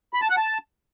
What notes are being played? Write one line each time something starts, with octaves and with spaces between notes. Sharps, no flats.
B5
A5
F#5
A5